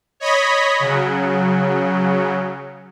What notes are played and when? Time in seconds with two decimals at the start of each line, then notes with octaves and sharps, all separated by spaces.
0.20 C#5 D#5 B5
0.80 C#3 F#3